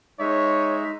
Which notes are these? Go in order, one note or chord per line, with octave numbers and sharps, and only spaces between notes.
G#3 D#4 C#5 E5